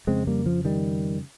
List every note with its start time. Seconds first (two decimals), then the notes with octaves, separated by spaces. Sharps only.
0.07 F2 C#3 G#3 C4
0.27 G3 A#3
0.46 F3
0.65 D#3 G3